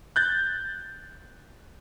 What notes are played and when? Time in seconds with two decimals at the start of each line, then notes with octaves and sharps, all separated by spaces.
0.16 F#6 G6 A6